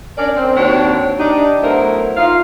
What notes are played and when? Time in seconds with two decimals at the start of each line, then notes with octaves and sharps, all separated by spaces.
0.17 C#4 D4 A#4 D5
0.35 C4
0.56 D#2 C4 D4 F#4 C5 C#5
1.19 D4 D#4 G4
1.61 F#3 A3 B3 E4 A#4 C5
2.17 D#4 F4 F5